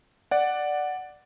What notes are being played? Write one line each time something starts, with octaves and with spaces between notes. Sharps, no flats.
D5 F#5